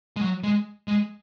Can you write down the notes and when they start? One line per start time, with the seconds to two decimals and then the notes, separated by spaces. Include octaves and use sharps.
0.16 G#3
0.21 F#3
0.43 G#3
0.88 G#3